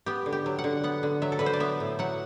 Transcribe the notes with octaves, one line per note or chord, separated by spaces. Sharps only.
B3 G4
D3
G4
F#3
F#5
D3
B3 F#5
D3
F#3 E5
A4
D3 B4
C5
D5
B3 E5
A2
F#3 F#5